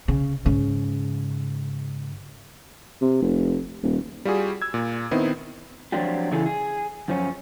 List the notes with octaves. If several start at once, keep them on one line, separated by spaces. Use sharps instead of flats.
C#3
G#2 C#3
C3
F1
D#1
G3 F4 F#4 G#4
E6 G#6
A#2
D#3 B3 C4 D#4 E4
F3 F#3 C4 D4 F4 G4
C#3 E3 E4 G#4 A4
G#4
F#2 F3 C#4